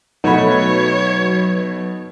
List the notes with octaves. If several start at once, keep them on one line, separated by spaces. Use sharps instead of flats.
B2 F#3 A3 D#4 B4 C#5